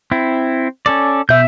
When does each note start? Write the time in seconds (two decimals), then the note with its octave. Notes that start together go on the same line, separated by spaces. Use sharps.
0.11 C4 E4
0.86 C#4 A4 D5
1.29 B2 E5 G6